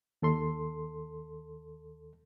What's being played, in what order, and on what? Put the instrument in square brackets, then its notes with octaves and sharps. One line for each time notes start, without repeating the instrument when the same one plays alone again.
[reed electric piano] D#2 A4 C6